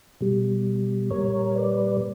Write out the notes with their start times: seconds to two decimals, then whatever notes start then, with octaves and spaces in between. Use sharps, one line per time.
0.21 B2 G3
1.11 A#2 G3 A#4 C#5
1.55 B4 D5